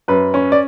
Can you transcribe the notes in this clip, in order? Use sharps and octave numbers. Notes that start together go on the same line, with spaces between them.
F#2 B4
C#4
D5